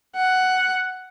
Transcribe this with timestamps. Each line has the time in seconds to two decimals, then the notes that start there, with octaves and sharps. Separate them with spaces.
0.16 F#5